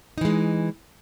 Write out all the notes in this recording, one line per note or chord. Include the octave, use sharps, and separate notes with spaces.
E3 G#3 D#4